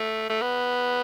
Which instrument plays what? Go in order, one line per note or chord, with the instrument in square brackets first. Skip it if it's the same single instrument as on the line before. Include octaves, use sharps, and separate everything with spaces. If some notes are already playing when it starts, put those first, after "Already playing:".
Already playing: [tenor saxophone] A3
A3
B3